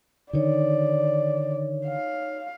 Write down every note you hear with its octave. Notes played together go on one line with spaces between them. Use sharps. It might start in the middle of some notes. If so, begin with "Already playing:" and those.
D3 D#3 D#4 C#5 D5
F5